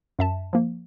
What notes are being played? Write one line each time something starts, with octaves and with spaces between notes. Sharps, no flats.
F#2 E5 A5
F3 A#3